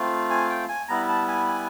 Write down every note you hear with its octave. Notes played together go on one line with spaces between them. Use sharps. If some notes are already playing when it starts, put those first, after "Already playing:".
Already playing: A3 C4 F4
G#5
G5
G#5
G3 B3 E4 A#5
A5
G#5
G#5